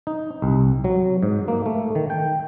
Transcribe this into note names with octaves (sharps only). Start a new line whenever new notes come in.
D#4
C2
F#3
G#2
A#3
A3
D#3
G5